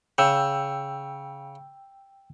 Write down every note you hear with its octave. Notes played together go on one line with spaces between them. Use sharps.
C#3 G5 E6